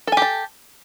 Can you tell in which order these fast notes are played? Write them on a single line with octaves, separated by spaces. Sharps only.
A4 G#5 G4 A5